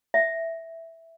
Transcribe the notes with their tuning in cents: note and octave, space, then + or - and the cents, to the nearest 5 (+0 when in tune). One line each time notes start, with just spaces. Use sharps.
E5 -5